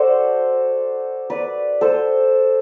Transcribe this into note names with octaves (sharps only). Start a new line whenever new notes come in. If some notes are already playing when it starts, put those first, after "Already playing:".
Already playing: F#4 A4 C5 D5
B4 D5
A4 C5